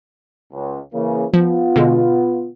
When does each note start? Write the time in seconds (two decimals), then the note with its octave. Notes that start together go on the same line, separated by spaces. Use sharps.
0.53 C#2
0.94 C#3 E3 A#3
1.34 F3 B3 F4
1.76 B2 D3 G#3